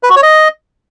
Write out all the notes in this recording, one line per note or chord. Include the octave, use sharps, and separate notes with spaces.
B4
F#4
C#5
D#5